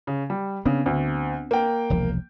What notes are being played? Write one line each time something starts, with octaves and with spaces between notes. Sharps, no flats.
C#3
G3
C#3 B3 C4 D4
D2
A#3 G5
E1 C2 F3